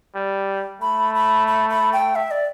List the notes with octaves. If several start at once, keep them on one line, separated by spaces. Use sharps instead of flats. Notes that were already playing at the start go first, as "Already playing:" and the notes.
G3
A3 B5
B5
B5
B5
G5
E5
D5